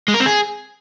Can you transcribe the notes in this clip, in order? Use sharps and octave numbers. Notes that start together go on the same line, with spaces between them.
G#3
A#4
C4
G#4